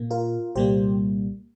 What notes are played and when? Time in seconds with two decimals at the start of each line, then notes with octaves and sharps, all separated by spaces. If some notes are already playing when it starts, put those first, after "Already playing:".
Already playing: A#2 A#3
0.10 F4 A#4
0.55 C2 A#2 G3 A#3 G4 C5